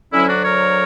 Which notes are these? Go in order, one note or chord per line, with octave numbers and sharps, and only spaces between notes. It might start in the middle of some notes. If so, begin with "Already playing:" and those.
D2 D3 F#3 C#4 E4
D4 F#4
A#4 C#5